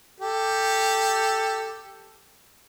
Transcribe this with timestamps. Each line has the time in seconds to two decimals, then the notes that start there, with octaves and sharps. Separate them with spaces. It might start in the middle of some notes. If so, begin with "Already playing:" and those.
0.20 G4 A4